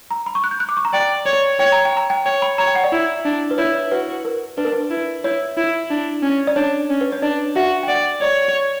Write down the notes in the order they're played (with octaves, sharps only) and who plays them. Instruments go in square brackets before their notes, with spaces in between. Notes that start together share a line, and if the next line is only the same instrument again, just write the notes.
[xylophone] A#5
B5
C#6
F#6
G6
F#6
D6
C#6
A#5
[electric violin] D5 [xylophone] G5
[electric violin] C#5
[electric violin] C#5 [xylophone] G5
[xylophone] A#5
G5
A#5
G5
[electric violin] C#5 [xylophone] G5
[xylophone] B5
[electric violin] C#5 [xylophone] A#5
[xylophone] G5
F#5
D5
[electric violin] E4
D4
[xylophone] B4
[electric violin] E4 [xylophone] C#5
[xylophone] C#5
[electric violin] F#4 [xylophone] B4
[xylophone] A#4
[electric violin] D4 [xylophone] B4
[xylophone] A#4
B4
[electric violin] E4
[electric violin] E4 [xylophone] C#5
[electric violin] E4
D4
C#4
[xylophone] D5
[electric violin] D4 [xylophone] C#5
[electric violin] C#4
[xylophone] B4
C#5
[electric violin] D4 [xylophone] D5
[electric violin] F#4 [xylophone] E5
[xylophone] G5
[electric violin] D5 [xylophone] F#5
[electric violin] C#5 [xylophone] D5